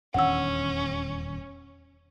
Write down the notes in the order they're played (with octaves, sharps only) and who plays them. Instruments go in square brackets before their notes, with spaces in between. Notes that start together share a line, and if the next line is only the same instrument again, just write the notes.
[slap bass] D#1 E2 D4 [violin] C#4 [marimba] F#5 E6